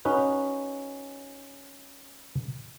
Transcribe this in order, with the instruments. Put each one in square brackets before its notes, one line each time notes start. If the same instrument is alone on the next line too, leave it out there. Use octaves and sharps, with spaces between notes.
[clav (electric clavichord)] C#4 D#4 F#4 B4